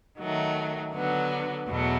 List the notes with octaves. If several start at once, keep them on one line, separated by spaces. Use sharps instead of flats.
D#3 F#3 A3
D3 F#3 B3
E2 B2 F#3 A3